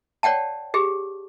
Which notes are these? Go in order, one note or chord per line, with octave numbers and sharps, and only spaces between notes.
C#5 D5 F#5 G5 A5
G4 G#4